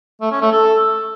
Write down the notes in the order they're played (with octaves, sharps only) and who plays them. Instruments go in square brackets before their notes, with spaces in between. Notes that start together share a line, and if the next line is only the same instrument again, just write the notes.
[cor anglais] A3
C#4
A3
A4